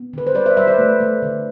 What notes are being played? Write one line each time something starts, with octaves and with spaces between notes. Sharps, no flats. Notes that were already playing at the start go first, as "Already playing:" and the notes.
Already playing: B3
D3 B4
C5
G3 B4 D5
C5 E5
G3 C5 E5
B4 D5
A3
A3
D3